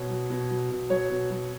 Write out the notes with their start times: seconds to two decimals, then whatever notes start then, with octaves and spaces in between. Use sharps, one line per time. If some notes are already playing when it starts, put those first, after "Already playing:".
Already playing: B2 C#5
0.10 F#3
0.30 B2
0.50 F#3
0.70 B2
0.90 F#3 C#5
1.10 B2
1.30 F#3